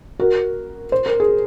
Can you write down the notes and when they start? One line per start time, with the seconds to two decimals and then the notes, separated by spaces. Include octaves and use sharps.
0.20 F#4 A#4
0.92 C5
1.06 A#4
1.20 G#4